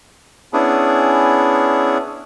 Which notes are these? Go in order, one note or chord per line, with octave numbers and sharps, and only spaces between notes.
B3 C#4 D4 E4 G#4